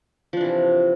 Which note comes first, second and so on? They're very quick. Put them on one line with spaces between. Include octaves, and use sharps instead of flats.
F3 D4 E3 C3